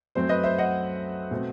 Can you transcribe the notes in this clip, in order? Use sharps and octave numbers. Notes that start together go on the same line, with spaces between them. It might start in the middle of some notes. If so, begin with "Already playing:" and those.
F#2 F#3 A3 C4 C5
B4 D#5
C5 E5
D#5 F#5
B2 A3 C4